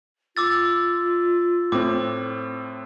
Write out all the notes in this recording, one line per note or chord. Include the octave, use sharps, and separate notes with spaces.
F4 D6 E6 A6
A2 C4 D6